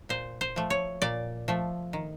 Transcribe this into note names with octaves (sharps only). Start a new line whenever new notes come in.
A#2 C5
C5
F3 A3
C#5
A#2 D5
F3 A3
D#3